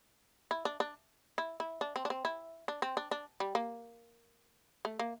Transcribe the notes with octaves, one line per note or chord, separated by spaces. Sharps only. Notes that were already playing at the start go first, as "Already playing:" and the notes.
E4
D4
D4
E4
E4
D4
C4
D4
C4
E4
D4
C4
D4
D4
G3
A#3
A3
A#3